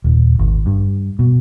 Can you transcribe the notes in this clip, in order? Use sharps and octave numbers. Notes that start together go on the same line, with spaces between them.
D#1
G#1
G2
B2